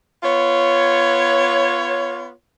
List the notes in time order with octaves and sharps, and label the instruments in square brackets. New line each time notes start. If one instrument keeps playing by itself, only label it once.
[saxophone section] B3 F4 C#5